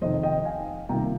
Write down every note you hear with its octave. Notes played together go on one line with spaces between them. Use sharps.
F2 C3 D#3 C5 D#5
D#5 G5
F5 G#5
C2 C3 D#3 A#3 F4 G5 A#5